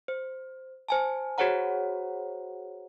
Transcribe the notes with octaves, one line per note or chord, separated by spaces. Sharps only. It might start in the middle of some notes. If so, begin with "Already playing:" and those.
C5
C5 G#5 A5
F#4 G#4 C5 C#5 F#5 A#5